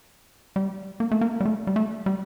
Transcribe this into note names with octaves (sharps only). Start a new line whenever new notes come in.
G3
A#3
A3
A#3
G3
A3
G3
A3
G3